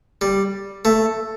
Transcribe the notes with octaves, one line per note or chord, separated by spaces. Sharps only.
G3
A3